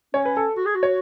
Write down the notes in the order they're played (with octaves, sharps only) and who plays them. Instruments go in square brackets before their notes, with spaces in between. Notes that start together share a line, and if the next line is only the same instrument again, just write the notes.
[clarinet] C#4 [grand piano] C#5
[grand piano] B4
A4
[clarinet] F#4
G#4
F#4
[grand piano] C#5